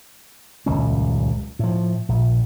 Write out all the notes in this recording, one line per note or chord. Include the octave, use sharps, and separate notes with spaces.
D#1 C#2 F#2 C#4
A2 F3
A#1